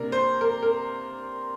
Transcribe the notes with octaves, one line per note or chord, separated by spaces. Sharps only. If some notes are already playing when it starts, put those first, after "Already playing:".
Already playing: C3 A#3 D4 A#4
C5
A#4
A#4